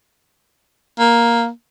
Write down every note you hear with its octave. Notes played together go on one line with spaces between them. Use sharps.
A#3